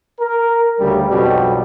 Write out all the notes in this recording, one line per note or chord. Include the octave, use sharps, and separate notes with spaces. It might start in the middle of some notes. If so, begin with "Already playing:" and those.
A#4
D2 C#3 G3
B1 F2 B2 G3